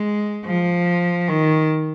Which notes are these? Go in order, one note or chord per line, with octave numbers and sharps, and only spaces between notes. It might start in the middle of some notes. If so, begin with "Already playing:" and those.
Already playing: G#3
F3
D#3